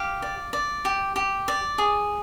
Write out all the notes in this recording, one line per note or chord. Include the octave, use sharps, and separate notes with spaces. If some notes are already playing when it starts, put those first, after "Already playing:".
Already playing: G4 F5
D5
D5
G4
G4
D5
G#4